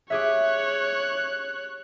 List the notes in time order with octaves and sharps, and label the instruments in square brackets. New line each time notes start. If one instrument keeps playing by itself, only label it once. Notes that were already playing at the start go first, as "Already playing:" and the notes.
[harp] G4 G#4 E5 [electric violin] C#5 F#6